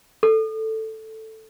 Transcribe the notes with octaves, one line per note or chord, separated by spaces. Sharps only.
A4